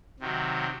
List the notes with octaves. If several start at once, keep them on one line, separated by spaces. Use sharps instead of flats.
C3 D#3 F#3